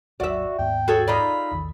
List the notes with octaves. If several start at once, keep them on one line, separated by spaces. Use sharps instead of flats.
G#1 D#2 F#3 F#4 D5 E5
D#2 G#2 B3 G5
F#4 G#4 A4 C#5
D#4 F4 D5 B5
A#1 E2 D#3